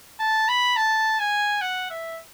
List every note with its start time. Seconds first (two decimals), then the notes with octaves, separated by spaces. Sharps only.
0.19 A5
0.48 B5
0.76 A5
1.19 G#5
1.61 F#5
1.90 E5